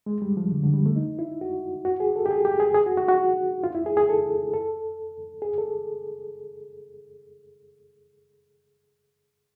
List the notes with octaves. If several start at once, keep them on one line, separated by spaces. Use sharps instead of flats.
G#3
G3
F3
D3
D3
G3
A3
D#4
E4
F#4
F#4
G#4
A4
G4
G#4
G4
G#4
G#4
F#4
F#4
F#4
F4
E4
G#4
G#4
A4
A4
G#4
A4